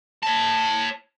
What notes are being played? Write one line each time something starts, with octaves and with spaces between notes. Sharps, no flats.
C#5 A5